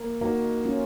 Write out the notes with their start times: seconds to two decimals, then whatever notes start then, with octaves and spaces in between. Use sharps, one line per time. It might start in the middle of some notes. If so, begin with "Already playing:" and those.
Already playing: A#3
0.21 A#3 D#4 F#4
0.65 C#4 F4